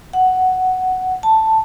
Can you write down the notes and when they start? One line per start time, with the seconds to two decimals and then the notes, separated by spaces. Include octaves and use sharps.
0.13 F#5
1.23 A5